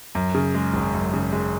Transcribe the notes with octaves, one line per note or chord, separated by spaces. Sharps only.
F#2
C#3
G#3
G#1
F#2
C#3
G#3